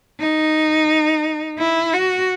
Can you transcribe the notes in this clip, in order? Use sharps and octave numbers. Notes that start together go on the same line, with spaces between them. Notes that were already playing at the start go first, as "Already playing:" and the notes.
D#4
E4
F#4